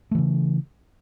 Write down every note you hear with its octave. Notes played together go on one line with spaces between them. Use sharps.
C#3 E3 A3